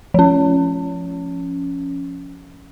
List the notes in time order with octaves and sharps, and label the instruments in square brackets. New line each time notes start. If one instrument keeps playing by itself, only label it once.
[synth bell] F3 C#4